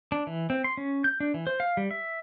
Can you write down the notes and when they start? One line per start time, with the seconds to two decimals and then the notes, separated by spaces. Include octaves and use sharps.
0.12 D4
0.27 E3
0.50 C4
0.64 C6
0.77 C#4
1.04 G6
1.20 D4
1.34 E3
1.47 C5
1.60 F5
1.77 G3
1.91 E5